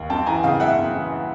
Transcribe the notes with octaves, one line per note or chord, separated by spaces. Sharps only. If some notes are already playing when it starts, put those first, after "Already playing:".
Already playing: D#2
F#2 G5 A5
E3 G#5 A#5
C#3 F5 G5
F#2 E5 F#5
F#2
E3